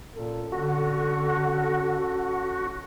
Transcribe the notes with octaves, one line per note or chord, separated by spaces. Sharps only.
A#2 C#4 A4
D3 F#4